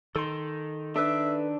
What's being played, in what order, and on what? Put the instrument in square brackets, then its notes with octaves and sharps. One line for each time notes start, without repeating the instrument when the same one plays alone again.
[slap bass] D#3 [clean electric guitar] A4 C6
[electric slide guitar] D4 [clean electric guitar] A4 B4 [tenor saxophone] E5